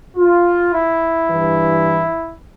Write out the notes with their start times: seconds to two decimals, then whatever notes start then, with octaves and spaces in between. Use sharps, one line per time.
0.17 F4
0.72 E4
1.27 G2 E3